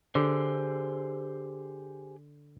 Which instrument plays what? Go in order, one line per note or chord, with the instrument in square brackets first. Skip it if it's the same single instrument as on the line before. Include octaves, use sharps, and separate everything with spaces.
[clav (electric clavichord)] D3 [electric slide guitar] G4 G#4 C5